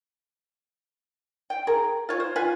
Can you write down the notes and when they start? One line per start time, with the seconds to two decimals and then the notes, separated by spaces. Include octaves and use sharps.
1.50 G5
1.67 G#4 A#4
2.09 F4 C#5
2.20 C5
2.36 F4 B4 G#5